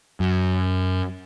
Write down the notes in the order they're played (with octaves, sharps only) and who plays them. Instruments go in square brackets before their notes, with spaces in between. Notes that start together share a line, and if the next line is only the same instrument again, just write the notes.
[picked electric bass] F#2